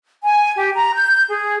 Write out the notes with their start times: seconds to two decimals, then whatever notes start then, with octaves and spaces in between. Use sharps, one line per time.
0.22 G#5
0.56 G4
0.75 A#5
0.94 G6
1.29 G#4